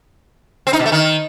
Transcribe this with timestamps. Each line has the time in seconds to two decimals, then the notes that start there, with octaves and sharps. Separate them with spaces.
0.67 C4
0.73 D#4
0.79 B2
0.86 A3
0.92 D#3